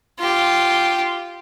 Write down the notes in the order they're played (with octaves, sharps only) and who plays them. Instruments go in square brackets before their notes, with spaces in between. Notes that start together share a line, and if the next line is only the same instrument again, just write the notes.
[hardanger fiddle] F4 G4